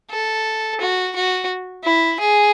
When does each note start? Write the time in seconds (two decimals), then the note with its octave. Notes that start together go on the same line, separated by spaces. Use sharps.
0.11 A4
0.81 F#4
1.15 F#4
1.84 E4
2.20 G#4